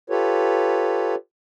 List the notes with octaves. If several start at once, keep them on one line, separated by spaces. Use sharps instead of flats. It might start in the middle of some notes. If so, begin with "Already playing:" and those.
F4 G4 A4 B4 C#5